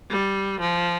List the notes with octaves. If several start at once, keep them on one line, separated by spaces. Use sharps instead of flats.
G3
F3